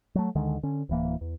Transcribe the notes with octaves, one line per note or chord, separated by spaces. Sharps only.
F#3 A3
D2 D3 D#3 G#3
D3 C#4
D1 E3 A#3
E2